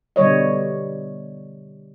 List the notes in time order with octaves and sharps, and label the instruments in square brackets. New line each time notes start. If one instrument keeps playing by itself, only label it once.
[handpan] B2 D3 G3 C#5 D#5